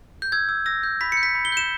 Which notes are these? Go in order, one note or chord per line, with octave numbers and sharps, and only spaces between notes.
G6
E6 G#6
E6
E6 A#6
G6
B5 B6
C#7
G6
B6
B5
G7
G6 E7